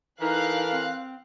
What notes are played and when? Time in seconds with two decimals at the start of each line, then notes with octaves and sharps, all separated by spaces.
0.20 E3 D#4 A4 A#4 F5 F#6
0.72 C4